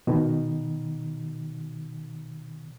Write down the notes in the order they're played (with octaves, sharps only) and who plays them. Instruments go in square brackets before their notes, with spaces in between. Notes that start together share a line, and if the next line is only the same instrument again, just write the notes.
[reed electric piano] B2 D#3